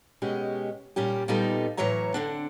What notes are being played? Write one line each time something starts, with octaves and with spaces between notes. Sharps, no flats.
B2 G#3 C#4 G4
A#2 G3 C#4 G4
A#2 G3 B3 D#4 A4
A2 E3 F#3 C#5 E5 A#5
D3 C4 D4